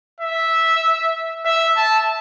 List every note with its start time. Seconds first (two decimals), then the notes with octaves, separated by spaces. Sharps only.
0.21 E5
1.45 E5
1.77 A5